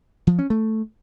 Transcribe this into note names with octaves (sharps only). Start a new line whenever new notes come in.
F3
C#4
A3